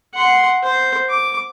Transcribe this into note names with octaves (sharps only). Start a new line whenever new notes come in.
F#5 C6
C5
D6